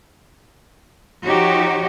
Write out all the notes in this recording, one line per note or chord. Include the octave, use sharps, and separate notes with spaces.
F3 D#4 F#4 G4 C#5